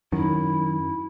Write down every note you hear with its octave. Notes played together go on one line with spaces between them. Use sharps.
F#2 D#3 E4